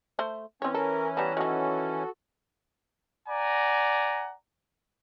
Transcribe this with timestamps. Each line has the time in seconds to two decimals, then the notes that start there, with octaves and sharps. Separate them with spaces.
0.19 A3 C5
0.62 E3 C4 C#4 C#5
0.74 A4 A#4
1.17 G3 B3 B4 A5 A#5
1.37 D#3 F#3 F#4 A4
3.29 D5 F#5 G#5 A#5